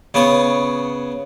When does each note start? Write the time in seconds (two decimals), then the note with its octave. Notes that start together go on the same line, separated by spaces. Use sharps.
0.14 C#3 B3 C#5